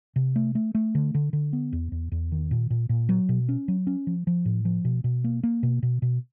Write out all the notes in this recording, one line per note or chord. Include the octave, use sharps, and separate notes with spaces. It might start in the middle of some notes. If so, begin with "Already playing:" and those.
C3
A3
A3
A3
D3
D3
D3
B3
E2
E2
E2
D#3
A#2
A#2
A#2
F#3
B2
C#4
F#3
C#4
F3
F3
A2
F3
B2
B2
A#3
A#3
B2
B2
B2